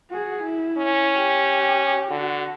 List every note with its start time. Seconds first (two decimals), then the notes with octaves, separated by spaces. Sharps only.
0.11 F#4 G#4
0.43 E4
0.78 C#4
1.15 G4
2.11 D3 F#4